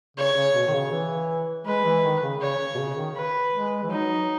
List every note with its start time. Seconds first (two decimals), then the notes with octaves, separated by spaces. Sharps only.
0.17 C#3 C#5
0.36 C#3
0.54 B2
0.67 D#3
0.74 C#3
0.91 E3
1.66 G#3 B4
1.85 E3
2.04 D#3
2.22 C#3
2.41 C#3 C#5
2.74 B2
2.79 C#3
2.97 D#3
3.16 B4
3.53 G#3
3.83 E3
3.90 F#3 D#4